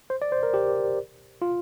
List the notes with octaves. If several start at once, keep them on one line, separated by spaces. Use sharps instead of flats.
C5
D5
C5
A#4
G4
F4